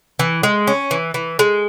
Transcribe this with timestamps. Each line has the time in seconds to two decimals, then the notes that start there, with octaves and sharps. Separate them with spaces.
0.19 E3
0.43 G#3
0.67 C#4
0.91 E3
1.14 E3
1.39 G#3